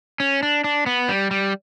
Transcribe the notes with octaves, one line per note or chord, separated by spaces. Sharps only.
C#4
D4
D4
B3
G3
G3